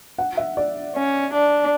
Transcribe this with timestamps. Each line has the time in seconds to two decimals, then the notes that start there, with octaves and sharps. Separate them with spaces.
0.18 F#5
0.37 E5
0.57 D5
0.95 C#4
1.33 D4